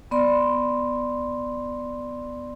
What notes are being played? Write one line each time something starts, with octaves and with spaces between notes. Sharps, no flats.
B3 D5 C6